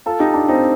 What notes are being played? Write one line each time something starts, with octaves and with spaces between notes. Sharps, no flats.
F4 A4
D#4 G4
D4 F4
C4 D#4